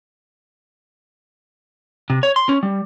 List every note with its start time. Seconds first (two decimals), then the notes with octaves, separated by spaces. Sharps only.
2.10 C3
2.23 C#5
2.36 C6
2.49 C#4
2.63 G3